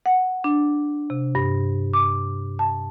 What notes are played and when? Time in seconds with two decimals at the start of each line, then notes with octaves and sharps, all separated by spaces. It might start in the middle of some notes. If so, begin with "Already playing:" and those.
0.06 F#5
0.44 D4
1.10 C3
1.35 G2
1.93 D6
2.59 A5